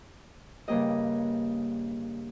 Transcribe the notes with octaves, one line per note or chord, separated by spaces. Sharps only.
G2 C#3 A#3 G4 D#5